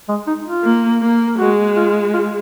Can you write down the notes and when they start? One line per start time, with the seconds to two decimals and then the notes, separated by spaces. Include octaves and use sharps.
0.09 G#3
0.27 D#4
0.45 F4
0.64 A#3
1.02 A#3
1.39 G#3 F#4
1.76 F4
2.14 F4